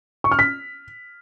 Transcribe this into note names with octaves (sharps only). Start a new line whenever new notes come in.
C#6
F6
B6